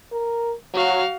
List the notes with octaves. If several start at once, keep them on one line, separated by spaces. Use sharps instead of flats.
A#4
F#3 F#4 F5